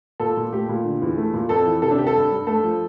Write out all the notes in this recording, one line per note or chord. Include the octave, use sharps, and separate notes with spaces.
A#2 A4
A#2
A3 G4
A#2
D3
E2
A3
A#2
F2 A4
E3
C3 A4
D4
C3 G4
A4
G2
G2
A3 A4
F3